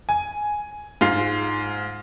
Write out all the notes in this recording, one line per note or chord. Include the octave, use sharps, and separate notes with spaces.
G#5
G#2 F4 C7